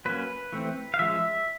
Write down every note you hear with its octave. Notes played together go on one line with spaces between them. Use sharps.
F#3 A#3 C#4 B4
E3 A3 C4
F5
F3 G#3 C#4 E5